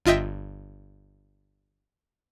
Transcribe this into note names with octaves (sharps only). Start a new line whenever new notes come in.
G1 F4 D#5 E5 G5 B6